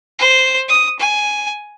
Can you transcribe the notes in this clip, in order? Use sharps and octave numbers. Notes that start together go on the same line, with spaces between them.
C5
D#6
G#5